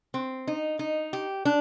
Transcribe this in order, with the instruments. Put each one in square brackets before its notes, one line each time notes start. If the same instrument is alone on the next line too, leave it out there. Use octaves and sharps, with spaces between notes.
[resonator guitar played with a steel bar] C4
D#4
D#4
G4
D4